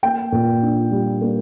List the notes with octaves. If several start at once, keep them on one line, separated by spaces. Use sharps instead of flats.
A#3 G5
A#2
D4
G3
A#3